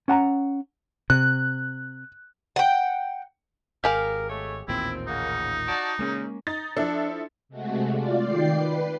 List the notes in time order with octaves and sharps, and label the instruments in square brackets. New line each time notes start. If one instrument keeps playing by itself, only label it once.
[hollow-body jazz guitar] C#4 F#5 A5 A#5
[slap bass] C3 [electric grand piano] F#6
[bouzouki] F#5 G5
[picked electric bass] G#1 [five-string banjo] G4 G#4 F5 [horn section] A#4
[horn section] G#3 A3 C#5
[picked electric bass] A1 D#2 A#2 [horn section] C4 [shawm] E4
[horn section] C#3 A#3 F#5 [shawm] D#4
[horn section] F#4 D5 A5
[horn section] A#2 C#3 [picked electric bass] G#3 A#3 C#4
[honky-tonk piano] D#4 A6
[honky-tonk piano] F3 E4 A4 [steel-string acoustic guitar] D4
[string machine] C3 G#3 A3 F#4
F4 D5
D#3 D5 G5 C7
B4